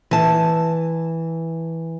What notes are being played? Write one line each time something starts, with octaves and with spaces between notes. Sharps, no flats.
E3 A5